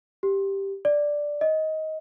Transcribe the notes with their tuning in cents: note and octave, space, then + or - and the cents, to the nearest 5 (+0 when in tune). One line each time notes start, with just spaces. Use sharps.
G4 +0
D5 +0
D#5 +15